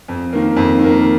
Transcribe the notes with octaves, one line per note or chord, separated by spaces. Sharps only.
F2
D#3 A#3
F2
D#3
A#3